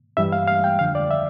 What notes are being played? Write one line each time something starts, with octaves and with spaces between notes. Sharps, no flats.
G2 E3 G3 E5
F5
F5
G5
F2 D3 F3 F5
D5
E5